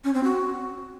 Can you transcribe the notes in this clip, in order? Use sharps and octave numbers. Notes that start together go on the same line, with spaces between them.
C#4
C4
F#4